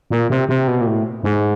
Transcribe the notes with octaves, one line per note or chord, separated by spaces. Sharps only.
A#2
C3
C3
B2
A#2
A2
G#2